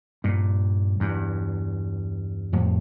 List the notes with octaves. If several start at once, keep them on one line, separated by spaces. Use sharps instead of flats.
G2 A#2
E2 G2
F2 A2